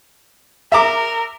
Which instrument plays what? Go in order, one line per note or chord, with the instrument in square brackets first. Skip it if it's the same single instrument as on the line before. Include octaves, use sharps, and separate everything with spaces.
[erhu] A#4 [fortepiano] E5 A#5 D6